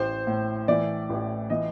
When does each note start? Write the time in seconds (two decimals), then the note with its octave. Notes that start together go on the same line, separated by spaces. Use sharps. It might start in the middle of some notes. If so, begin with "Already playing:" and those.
Already playing: A1 C5
0.27 A2
0.68 E3 D5
1.09 A1
1.50 E3 D#5